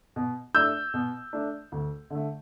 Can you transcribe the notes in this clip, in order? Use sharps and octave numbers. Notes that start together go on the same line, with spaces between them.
B2
A3 D4 E6 G6
B2
A3 D4
D2
D3 A3